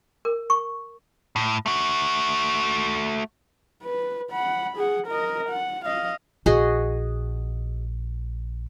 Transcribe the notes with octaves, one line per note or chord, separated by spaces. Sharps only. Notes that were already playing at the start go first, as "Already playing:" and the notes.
A#4
C#6
A2
A3 F#4
B4
F#5 B5
G#4 F#5
A#4 D#5
F#5
D#5 F5
A#1 F#4 G#4 D#5